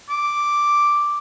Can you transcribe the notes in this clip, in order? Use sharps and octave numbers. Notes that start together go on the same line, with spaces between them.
D6